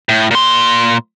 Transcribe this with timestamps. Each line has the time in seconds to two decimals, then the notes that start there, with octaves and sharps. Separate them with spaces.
0.09 A2
0.31 A#2 C6